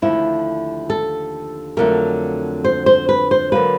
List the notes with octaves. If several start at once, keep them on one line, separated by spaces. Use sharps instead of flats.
D#2 D3 F3 A3 E4
A4
F2 D3 F#3 A3 A#4
C5
C5
B4
C5
D3 F#3 A#3 B4